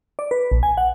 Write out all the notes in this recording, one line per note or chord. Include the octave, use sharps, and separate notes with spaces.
D5
B4
A#1
G#5
F#5